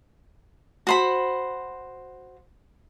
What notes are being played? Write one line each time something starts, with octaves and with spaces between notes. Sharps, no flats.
F#4 C5 B5